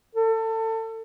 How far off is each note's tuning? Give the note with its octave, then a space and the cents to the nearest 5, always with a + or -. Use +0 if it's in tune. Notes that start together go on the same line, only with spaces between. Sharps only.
A4 +25